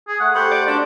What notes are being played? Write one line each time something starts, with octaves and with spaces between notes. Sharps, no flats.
G#4
A3 F#5
A3 G4 C5 F#5 B5
D5
A#3 D4 F#4